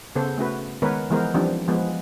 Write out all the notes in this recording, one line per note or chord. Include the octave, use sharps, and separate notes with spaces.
C#3 B3 A4 C5
A3 C#4 F#4 B4
D#3 G#3 B3 A#4 B4 C#5
E3 F3 G#3 B3 A#4 C5
E3 F3 G3 C4 D4 D#4
F3 G#3 B3